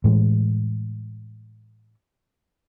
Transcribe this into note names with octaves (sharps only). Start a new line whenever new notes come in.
A2 E3 G#3